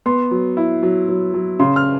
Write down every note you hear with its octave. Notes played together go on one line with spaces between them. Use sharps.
B3 C6
F#3
E4
F#3
F#3
F#3
C#3 C6
F6